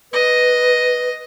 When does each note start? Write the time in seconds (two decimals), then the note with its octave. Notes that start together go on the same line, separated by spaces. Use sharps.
0.13 B4 D#5